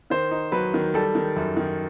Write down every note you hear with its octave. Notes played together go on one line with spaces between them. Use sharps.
D#3 C5
D#4
F#3 B4
D#3
G3 A4
D#3
F#2
D#3